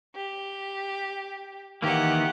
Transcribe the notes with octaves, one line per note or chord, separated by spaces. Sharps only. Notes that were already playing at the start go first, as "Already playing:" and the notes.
G4
D#3 E3 A#3 G4 F#5